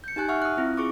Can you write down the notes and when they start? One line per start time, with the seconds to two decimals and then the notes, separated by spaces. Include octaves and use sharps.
0.04 G6 C#7
0.16 D#4 G4 G#5 F#6
0.28 E5 F#5 C#6 F6
0.42 D#6 F#6
0.57 C4 E4 F4
0.77 F4 G#4 C#6 D6